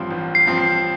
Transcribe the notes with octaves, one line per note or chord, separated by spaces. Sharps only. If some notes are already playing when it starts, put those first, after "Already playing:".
Already playing: A1 G2 F3 C4
A1
C7
G2 F3 C4
C7